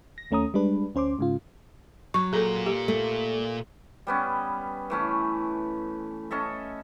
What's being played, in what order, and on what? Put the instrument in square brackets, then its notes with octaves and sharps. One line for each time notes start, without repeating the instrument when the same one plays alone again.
[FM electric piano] A#6
D#2 A3 C#4 A#5 D#6
G3 G#3 D4 B4
D2 C#4 C5 C6 D6
G#2 C#3 F4
[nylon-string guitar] F#3 [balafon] C#6
[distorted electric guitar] A#2 A#5 [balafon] G#4 A4
[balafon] G4
[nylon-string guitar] A3
[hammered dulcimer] G3 B3 C#4
E3 A3 C#4
C#4 A4 D#5 E5